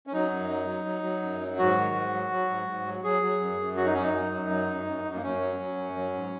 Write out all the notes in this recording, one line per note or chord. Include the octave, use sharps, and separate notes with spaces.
C#4
F#3 D#4
F#2
F#3
F#3
F#3
F#3
F#2
F#3
G#2 F#4
D#3
G#2
F#3
F#3
G#2
G#2
F#3
F#3 G#4
F#3
F#2
F#2
F#3 F#4
D#4
F#2 C#4
D#4
F#3
F#2
F#3
F#2
F#2
F#2
A#3
F#2 C#4
F#3
F#3
F#2
F#3
G#2